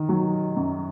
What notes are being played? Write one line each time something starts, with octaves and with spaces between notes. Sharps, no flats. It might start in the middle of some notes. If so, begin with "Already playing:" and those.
Already playing: D#3
F#3
F#2